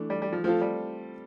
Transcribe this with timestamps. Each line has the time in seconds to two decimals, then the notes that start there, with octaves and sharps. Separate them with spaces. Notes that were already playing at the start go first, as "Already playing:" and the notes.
Already playing: E3 A3 D4
0.10 G3
0.22 G3
0.33 F3
0.44 F3 A3 C4 F4 A4
0.61 G3